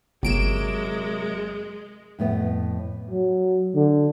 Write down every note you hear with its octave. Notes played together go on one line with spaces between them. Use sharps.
G1 C3 F#3 G#3 A#3 D7 E7
F2 A2 B3
F#3
D3